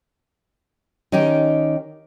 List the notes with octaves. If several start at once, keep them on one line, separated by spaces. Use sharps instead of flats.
D#3 C#4 D#4 G4